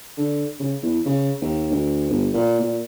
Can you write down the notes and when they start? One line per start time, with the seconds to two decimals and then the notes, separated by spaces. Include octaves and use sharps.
0.18 D3
0.60 C#3
0.82 E2
1.06 C#3
1.42 D#2
1.72 D2
2.10 G1
2.34 A#2
2.60 A#2